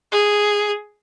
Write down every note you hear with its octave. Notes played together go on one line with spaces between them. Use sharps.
G#4